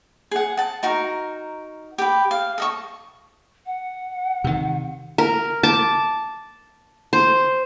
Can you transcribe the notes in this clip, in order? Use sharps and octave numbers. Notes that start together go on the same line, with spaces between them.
G#4 F#5
F#5 A5
D#4 F#4 A#4
G4 B4
F5
A4 D#5 C#6
F#5
C3 D#3
A#4
A5 D6
C5